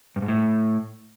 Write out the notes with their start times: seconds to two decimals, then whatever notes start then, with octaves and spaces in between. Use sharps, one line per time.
0.16 G2
0.22 G#2
0.28 A2